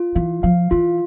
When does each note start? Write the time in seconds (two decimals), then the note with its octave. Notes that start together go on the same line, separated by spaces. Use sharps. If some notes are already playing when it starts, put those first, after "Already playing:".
Already playing: F4
0.15 E3 F5
0.43 F3 F5
0.71 E3 F4